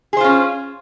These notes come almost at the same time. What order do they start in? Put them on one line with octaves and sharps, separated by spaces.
G#4 C5 F4 C#4